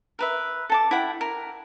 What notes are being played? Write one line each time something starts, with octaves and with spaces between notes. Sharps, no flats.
A#4 B4 E5
A4 A5 D6
E4 F#5 G5
A#4